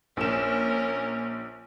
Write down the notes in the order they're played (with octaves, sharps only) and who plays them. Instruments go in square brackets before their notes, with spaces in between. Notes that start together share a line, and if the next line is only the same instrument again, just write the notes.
[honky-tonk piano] A#1 E7 [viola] C#4 A#4